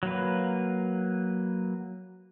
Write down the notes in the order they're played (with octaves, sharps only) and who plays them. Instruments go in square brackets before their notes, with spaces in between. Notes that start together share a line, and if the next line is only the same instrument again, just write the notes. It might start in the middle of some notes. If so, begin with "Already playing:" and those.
[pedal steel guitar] F#3 A#3 B4